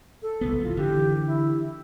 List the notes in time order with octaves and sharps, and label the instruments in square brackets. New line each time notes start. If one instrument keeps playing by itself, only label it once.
[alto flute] A4
[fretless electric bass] F#1 C2 B3
[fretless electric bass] E3 [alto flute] F4
[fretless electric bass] D3 E3 [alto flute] G4
[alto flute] E4